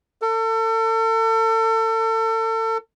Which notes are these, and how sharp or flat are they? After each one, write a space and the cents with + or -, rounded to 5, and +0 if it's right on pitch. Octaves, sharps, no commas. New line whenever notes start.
A4 +35